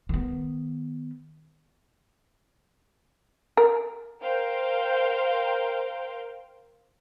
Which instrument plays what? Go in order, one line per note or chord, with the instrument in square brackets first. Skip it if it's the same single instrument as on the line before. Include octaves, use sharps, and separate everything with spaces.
[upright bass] D#3 B3
[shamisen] A#4
[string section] A#4 C5 F5 G5